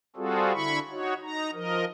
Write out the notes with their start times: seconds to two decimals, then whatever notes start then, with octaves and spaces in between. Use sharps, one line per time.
0.16 G3 C4 F4 F#4 G#4 A4
0.54 D3 E4 B5 C#6
0.91 D#4 F#4 C#5
1.23 D#4 A#5
1.53 F3 A#4 D#5